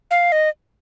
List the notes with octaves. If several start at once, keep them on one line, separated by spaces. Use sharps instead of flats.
F5
D#5